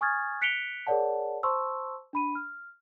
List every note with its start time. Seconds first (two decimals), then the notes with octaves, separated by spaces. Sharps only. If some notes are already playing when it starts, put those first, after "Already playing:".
0.01 G#5 C#6 D#6 F6 G#6 A6
0.41 F#6 B6 C#7 D7 F7 G7
0.87 G#4 A#4 C#5 D5 F#5 A5
1.43 C5 A5 C6 C#6 E6
2.13 D4 B5 D#7
2.35 F6